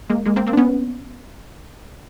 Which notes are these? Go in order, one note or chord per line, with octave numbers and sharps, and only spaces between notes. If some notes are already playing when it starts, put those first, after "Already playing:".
G#3 A#3
G#3 A#3
A#3 C4
A#3 C4
D4
B3 C#4